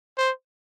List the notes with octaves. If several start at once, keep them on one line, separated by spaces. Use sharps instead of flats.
C5